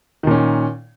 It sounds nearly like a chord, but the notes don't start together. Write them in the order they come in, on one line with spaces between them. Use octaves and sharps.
D#3 A#2 C#4